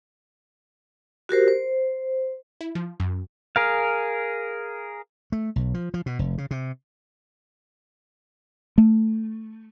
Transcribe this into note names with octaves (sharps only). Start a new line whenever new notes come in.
F#4 G4 A#4 C5
C5
E4
F3
F#2
G#4 A#4 F5
A3
B1
F3
F3
B2
F1
C#3
C3
A3